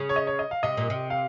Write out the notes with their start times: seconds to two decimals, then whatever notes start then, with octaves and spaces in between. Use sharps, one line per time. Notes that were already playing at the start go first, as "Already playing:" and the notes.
Already playing: C#3
0.09 C#5
0.16 D#5
0.27 C#5
0.39 D#5
0.51 F5
0.63 C3 D#5
0.77 A#2
0.90 C3
1.10 F5